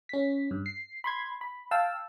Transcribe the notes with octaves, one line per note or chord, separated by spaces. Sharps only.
C#4 B6
G2
C7
B5 C6 G#6
B5
F5 G5 A5 E6